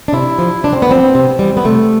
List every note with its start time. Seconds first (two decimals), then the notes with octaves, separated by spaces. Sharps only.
0.08 D4
0.13 C3 E4
0.39 F3
0.63 C3 D4
0.73 C4
0.82 B3
0.89 F3 C4
1.15 C3
1.39 E3 G3
1.57 B3
1.65 C3 A3